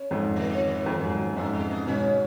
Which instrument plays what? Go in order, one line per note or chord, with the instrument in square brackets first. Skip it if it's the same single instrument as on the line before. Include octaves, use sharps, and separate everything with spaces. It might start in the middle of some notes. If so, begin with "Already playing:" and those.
Already playing: [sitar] C#4
[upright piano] F2 G#2
[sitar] D#3
F3
D#3
[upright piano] F2
G#2
F#2
[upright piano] F2 G#2 [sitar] F#3
[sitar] G#3
B3
[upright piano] G#2 B2 [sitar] C#4